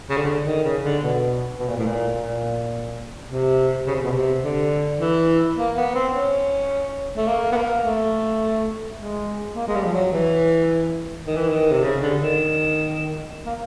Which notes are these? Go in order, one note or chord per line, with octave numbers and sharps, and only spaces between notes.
C#3
D3
D#3
C#3
D3
B2
B2
A#2
A2
A#2
A#2
C3
C#3
C3
B2
C3
D3
E3
A#3
B3
C4
C#4
A3
A#3
B3
A#3
A3
G#3
A#3
G#3
G3
F3
F#3
E3
D#3
E3
D#3
C3
C#3
D3
D#3
A#3